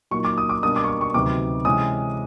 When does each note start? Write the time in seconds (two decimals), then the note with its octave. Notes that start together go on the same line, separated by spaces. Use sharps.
0.11 A#2 F#3 A#3 D#4 C#6
0.25 D6
0.38 D#6
0.49 D6
0.62 B2 G3 A#3 D4 D#6
0.76 D6
0.84 C#6
0.88 D6
1.01 C#6
1.14 D2 C3 D#3 F#3 B3 D6
1.65 C3 E3 G#3 C#4 D#6